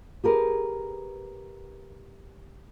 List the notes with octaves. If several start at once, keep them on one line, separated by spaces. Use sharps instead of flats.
G4 G#4 A#4 B4